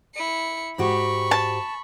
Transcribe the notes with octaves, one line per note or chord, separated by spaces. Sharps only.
E4 C#7
G#2 F#4 G4 B5 C#6
A5